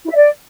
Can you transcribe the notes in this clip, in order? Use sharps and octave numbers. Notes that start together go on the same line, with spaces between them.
E4
E5
D5